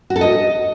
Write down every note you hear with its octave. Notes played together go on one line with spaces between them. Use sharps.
F#4
A4
D#5